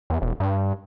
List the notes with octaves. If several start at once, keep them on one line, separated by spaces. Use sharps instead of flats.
E2
E1
G2